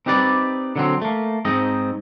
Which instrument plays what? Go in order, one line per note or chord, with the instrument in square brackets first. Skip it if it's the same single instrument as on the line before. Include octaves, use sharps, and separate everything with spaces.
[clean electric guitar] C4 D#4 G4 B4 D5
D3 F#3 C4
A3 A#3
G#2 C4 D#4 D#5